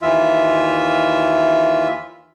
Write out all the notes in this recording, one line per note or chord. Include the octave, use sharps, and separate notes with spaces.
D#2 E3 F4 E5